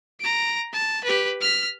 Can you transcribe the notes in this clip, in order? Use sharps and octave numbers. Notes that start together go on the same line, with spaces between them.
A#5 D7
A5
G4 B4
F6 B6